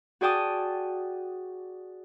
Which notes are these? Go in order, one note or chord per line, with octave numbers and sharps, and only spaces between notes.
F#4 G#4 D5 G5 A5 D#6